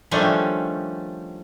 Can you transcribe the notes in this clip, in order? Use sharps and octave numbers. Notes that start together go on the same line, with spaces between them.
D#3 F3 G3 A3 C#4 D4